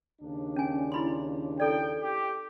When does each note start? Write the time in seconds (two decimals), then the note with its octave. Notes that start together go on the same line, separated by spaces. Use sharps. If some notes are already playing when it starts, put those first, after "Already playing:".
0.21 D#2 C#3 D4
0.56 C#4 G#5
0.92 E4 B5 C6
1.60 E4 A4 D5 G5
2.00 G4